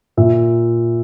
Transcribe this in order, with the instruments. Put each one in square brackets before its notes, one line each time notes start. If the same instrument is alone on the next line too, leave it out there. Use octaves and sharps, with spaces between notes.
[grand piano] A#2 E5